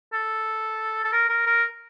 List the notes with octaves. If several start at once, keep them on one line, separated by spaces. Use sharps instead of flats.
A4
A4
A#4
A#4
A#4